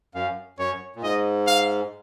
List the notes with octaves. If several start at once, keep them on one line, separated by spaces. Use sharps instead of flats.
F#2 F5
F#2 C#5
A#2
G#2 D#5
F5